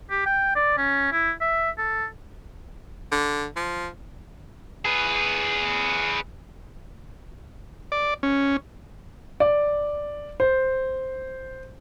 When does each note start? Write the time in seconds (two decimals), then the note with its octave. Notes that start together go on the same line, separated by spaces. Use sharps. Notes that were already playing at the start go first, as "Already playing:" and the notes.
0.10 G4
0.26 G5
0.55 D5
0.77 C#4
1.12 E4
1.41 E5
1.78 A4
3.12 D3
3.56 F3
4.85 G#4 B4
7.92 D5
8.23 C#4
9.40 D5
10.40 C5